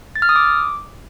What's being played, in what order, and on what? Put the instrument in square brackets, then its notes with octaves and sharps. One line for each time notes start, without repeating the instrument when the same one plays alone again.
[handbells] A6
F6
D#6
D6